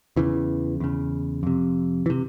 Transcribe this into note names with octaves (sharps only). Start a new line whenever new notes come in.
E2 C#3 E3
E2 C#3
F2 C3
E3
C3